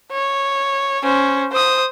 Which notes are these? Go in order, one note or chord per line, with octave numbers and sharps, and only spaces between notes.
C#5
C#4 C5
C5 D#6